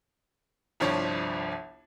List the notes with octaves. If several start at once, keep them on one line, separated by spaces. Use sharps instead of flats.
G1 C2 F3 D4 C#5